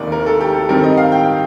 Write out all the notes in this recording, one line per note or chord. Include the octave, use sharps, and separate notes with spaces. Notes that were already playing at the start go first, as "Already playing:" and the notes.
Already playing: F1 D#2 D#3 A#3 D4 D5
A#4
A4
G4
A4
G2 D#3 G3 C4 A#4
D#5
F5
G5